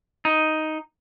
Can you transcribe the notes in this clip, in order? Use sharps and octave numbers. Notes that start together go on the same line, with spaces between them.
D#4